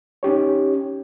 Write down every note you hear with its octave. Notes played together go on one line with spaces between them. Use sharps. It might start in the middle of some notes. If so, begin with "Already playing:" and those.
C#4 D#4 G4 C#5